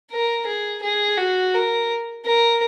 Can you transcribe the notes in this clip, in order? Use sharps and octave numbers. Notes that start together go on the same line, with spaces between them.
A#4
G#4
G#4
F#4
A#4
A#4